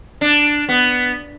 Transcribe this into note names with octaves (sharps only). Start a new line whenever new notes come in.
D4
B3